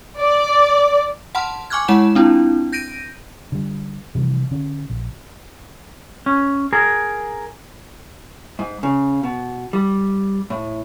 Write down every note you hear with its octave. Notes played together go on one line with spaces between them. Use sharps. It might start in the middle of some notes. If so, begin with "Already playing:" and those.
D5
F#5 A5 B5 C6 F6
G#5 C#6 D6 F6 F#6 G#6
G#3 E4 F#5 A5 C#6 E7
C4 D4 E4 F4
G6 A#6 D7 D#7
D3 G3
C3 E3 F3 G3
D3 C#4
A#1
C#4
G#4 A#4
G#2
C#3
B2
G3
A2